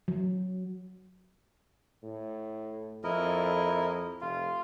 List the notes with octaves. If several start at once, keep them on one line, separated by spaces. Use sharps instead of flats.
F#3
A2
F2 E4 A#4 D#5
F1 F4